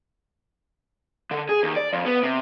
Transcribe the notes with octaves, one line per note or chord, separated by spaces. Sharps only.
D3
G#4
D#2
D5
F2
B3
C3